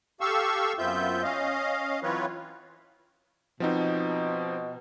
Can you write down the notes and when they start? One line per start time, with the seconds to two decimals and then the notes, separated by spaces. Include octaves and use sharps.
0.21 G4 A4 F5 C#6 E6
0.78 F#2 B3 C4 F4 E5 G6
1.23 C#4 D#5 F5
2.03 E3 F#3 C4 F4 B4 C#5
3.60 B2 F3 C4 D#4